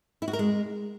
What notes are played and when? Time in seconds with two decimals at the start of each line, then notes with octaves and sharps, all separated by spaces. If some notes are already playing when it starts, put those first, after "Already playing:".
0.22 E4
0.28 F#4
0.33 A#4
0.39 G#3